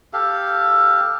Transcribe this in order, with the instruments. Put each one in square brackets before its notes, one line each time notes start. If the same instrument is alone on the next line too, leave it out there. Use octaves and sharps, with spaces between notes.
[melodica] G4 A4 F5